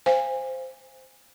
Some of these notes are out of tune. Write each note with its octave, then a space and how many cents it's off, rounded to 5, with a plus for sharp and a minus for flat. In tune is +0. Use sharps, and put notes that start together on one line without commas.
C5 -5 F5 -5 G#5 -25